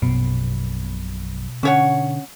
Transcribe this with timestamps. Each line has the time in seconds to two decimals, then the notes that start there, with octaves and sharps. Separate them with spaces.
0.02 A#1 F#2 B2
1.63 D3 C#4 C#5 F#5